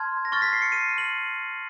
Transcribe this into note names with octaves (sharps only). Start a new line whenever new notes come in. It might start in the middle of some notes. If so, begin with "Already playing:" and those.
Already playing: A5 C6 F6 G#6
A#6
C#6 F6 A6
B6
C7
C#7
D#7
F#7